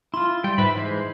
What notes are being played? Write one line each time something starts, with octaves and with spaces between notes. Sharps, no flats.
E4 F4 C6
G3 G5
G#2 B4 E5 B5
E3 G#3 C5